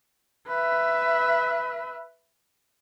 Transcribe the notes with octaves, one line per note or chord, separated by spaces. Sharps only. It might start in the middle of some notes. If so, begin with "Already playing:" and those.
B4 E5